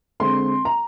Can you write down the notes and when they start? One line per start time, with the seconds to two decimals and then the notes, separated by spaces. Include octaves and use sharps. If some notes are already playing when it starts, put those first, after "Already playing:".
0.20 D3 G#3 C4 C6
0.65 A#5